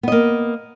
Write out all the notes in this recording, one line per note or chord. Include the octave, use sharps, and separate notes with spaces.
A#3 B3 D#5